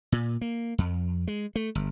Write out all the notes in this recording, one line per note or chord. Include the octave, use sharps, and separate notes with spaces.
A#2
A#3
F2
G#3
A3
G1